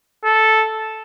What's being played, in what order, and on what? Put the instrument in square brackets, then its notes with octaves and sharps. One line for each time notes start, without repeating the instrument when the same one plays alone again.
[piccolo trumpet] A4